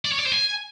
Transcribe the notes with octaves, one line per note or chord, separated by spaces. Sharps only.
D5
C#5
D5
C5
G#5